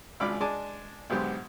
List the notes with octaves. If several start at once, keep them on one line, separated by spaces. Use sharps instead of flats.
G#1 C#2 D4 B5 D6 F6
G#3 D4 G#5 A5 D6
B1 G#2 D3 B3 G4 C5